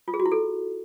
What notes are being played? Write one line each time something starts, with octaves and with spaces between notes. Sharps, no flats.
F4
G#4
F#4
E4
A4